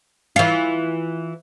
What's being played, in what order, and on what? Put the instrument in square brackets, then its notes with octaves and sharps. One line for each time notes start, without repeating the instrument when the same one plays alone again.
[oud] E3 F4